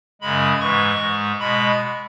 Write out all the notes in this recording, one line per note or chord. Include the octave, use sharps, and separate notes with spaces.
F#2 C#3 G#3 B5
G#2 E3 G#3 C#6
G#2 G#3
B2 G#3 B5